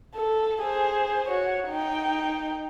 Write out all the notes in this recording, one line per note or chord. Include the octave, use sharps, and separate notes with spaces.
A4
G#4 C5
F#4 C#5
D#4 G5